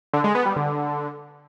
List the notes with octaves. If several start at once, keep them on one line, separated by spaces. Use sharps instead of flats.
D3
G#3
B3
G3
D3